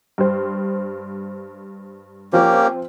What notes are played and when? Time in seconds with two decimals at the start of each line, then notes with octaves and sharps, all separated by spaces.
0.18 G2 C5
2.33 F3 A#3 C4 C#4 F4 G4